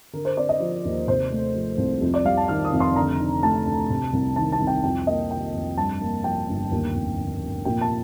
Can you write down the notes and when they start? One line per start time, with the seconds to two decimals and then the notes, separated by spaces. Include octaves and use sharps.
0.13 D3 A#4
0.25 C5
0.37 C4 D5
0.49 D#5
0.60 F3
0.85 D#2
1.08 C3 C5
1.31 A3
1.55 F3
1.78 C2
2.01 F2
2.14 D5
2.25 G3 F5
2.37 A5
2.48 D#3 F6
2.65 D#6
2.73 F1
2.80 C6
2.95 D3 A#5
3.19 D#4
3.43 A3 A5
3.67 D2
3.89 C3
4.13 C2
4.36 D#3 A5
4.52 A5
4.61 C2
4.67 G5
4.84 F2 G5
5.06 A#3 D#5
5.31 D#3 G5
5.54 F1
5.77 G2 A5
6.01 A#3
6.24 F3 G5
6.49 G1
6.72 D#2
6.94 F1
7.18 D3
7.42 F1
7.65 A#2 G5
7.81 A5